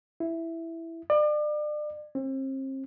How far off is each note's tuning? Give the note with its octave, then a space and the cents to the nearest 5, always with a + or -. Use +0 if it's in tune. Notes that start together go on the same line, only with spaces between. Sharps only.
E4 +5
D5 +35
C4 +35